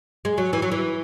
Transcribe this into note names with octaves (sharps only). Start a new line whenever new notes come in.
G#3
F#3
E3
F#3
E3